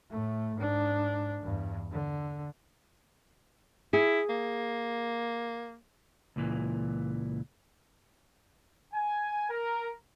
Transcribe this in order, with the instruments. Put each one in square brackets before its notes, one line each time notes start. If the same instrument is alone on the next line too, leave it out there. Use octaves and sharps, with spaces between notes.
[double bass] A2 A3
G#2 D4
E2 G2
D3
[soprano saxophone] E4 [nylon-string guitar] G#4
[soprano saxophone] A#3
[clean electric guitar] C#2 A#2 E3
[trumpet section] G#5
A#4